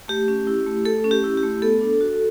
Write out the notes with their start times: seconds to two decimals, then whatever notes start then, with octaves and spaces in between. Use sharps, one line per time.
0.08 A3 G4
0.28 C#4
0.47 E4
0.66 A3
0.85 A3 A4
1.04 C#4
1.11 G4
1.24 E4
1.37 G4
1.43 A3
1.62 B3 A4
1.81 D4
2.01 F#4